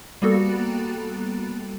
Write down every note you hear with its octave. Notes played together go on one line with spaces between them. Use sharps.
G3 A#3 B3 F#4 A4